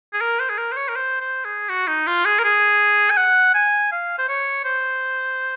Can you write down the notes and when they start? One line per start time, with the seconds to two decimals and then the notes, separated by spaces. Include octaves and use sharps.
0.13 G#4
0.21 A#4
0.40 C5
0.49 G#4
0.58 A#4
0.72 C5
0.77 C#5
0.88 A#4
0.96 C5
1.20 C5
1.45 G#4
1.69 F#4
1.87 D#4
2.07 F4
2.25 G#4
2.39 A#4
2.44 G#4
3.10 G#5
3.17 F#5
3.54 G#5
3.92 F5
4.18 C5
4.29 C#5
4.65 C5